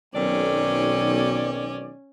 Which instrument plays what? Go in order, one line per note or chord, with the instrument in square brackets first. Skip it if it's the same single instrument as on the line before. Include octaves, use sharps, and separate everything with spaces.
[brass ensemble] B1 [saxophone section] D#3 C4 D5 [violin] C#4